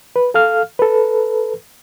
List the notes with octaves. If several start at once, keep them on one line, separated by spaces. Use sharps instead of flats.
B4
A4 F5 F6
A4 B4